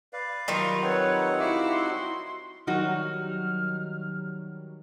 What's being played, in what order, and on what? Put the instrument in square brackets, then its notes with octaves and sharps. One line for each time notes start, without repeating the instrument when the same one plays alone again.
[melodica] B4 D5 F5
[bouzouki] D#3 G3 F4 [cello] F#3 [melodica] A#5 C6 C#6
[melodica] C4 D#4 F#5 [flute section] B4 C#5
[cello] E4 F#4 [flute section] E5 F5 D6
[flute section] C6
[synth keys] D#3 F#3 G3 [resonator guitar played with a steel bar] D#4 F#4 [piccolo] F6